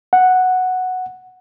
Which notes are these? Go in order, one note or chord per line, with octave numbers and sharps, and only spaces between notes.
F#5